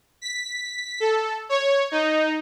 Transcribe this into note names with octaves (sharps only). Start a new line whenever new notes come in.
B6
A4
C#5
D#4